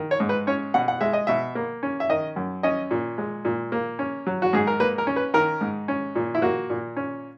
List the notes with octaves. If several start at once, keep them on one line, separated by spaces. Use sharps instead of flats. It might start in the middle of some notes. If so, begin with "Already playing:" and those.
Already playing: D#3
C#5
G#2
B4
C#4 C#5
B2 F#5
F#5
G#3 E5
D#5
B2 E5
A#3
C#4
E5
D#3 D#5
F#2
C#4 D#5
A#2
G#3
A#2
A#3
C#4
F#3
F#4
G#2 G#4
A#4
A#3 B4
A#4
C#4
B4
D#3 A#4
G#2
C#4
A#2
E4
A#3 F#4
A#2
C#4